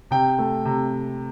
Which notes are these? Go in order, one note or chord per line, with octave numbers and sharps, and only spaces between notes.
C3 G5
A3
C3